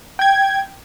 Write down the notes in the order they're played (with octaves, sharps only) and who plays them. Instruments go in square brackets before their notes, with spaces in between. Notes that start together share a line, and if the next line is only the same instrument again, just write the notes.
[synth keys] G5 G#6